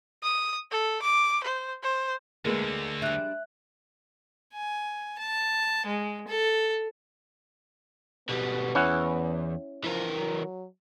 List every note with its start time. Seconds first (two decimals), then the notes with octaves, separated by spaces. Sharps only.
0.23 D#6
0.71 A4
1.02 D6
1.43 C5
1.83 C5
2.45 D2 D3 G#3 A#3 A#4 B4
3.02 G3 D4 E5 F#6
4.54 G#5
5.18 A5
5.87 G#3
6.27 A4
8.29 B2 G3 B3
8.75 E2 C#4 E4 F#5
9.84 E3 F3 A#4
10.16 F#3